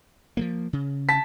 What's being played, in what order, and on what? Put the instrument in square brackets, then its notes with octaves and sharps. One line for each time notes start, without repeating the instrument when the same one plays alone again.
[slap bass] F3 F#3 A#3
C#3
[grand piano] A5 B6